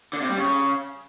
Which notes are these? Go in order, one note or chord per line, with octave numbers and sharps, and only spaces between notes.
D3
C3
G3
C#3